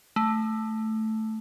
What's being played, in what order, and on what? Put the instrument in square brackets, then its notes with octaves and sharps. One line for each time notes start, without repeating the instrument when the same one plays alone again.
[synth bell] A3